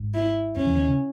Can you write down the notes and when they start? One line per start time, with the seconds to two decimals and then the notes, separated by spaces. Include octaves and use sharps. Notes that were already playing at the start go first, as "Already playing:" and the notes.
Already playing: G#1 G#2
0.14 E4
0.56 F#2 C#4
0.66 E2 E3
0.77 D#2 D#3
0.87 C#3 C#4